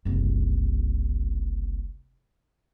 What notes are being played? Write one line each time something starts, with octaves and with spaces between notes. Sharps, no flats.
F#1 C2